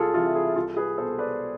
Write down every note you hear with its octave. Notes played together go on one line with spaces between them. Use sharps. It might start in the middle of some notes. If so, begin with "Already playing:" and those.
Already playing: C2 F4 G#4 A4
C3 E3 F4 A4
E4 G#4
C2 F4 A4
G#4 B4
B2 A4 C5
B4 D5